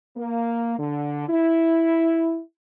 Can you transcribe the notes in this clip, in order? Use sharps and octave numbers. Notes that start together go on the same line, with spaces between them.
A#3
D3
E4